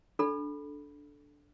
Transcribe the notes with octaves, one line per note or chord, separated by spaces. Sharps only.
D4 A4 B5